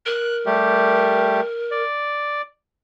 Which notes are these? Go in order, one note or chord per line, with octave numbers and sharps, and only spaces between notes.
A#4 F#6
G3 A3 G4
D5